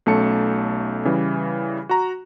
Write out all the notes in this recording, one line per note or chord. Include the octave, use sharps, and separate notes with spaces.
B1 A3 C#4 A5 C#7
C#3 E3 G3
F#4 A#5